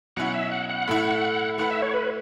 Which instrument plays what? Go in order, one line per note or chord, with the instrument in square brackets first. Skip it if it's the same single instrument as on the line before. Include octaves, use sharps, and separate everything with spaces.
[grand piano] B2 F#3 C#4 E4 [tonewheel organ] F#5
[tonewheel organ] E5
F#5
F#5
[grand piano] A2 A3 E4
[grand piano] A3 E4 B4 [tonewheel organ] F#5
[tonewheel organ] E5
C#5
B4